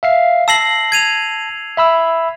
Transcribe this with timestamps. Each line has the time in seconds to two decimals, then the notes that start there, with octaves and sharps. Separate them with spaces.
0.03 E5 F5 C7
0.48 A5 E6 A#6 C7 F#7
0.92 G#6 D#7 F7
1.77 E5 B5 E6